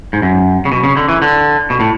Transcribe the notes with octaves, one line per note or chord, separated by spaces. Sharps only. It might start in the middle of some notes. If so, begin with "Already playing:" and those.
G#2
F#2
C#3
B2
C#3
D3
E3
D3
B2
A2